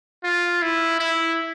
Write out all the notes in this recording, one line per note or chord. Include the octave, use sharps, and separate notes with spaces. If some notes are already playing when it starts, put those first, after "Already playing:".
F4
E4
E4